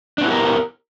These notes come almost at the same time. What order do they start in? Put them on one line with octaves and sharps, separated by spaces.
D4 B3 E4 G4 A#4